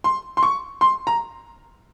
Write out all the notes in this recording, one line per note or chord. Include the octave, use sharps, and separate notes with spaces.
C6
C6
C#6
C6
A#5